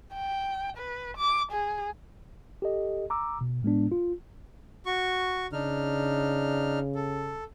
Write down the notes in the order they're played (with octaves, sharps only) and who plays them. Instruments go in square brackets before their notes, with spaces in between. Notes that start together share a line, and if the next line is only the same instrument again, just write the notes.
[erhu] G5
B4
D6
G#4
[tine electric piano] G4 A4 D#5
A#5 D6 E6
B2
A2 G#3 B3 D4
F4
[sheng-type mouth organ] F#4 C#6
[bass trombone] C#3 [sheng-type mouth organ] D4 D#4 F6
[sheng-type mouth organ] A4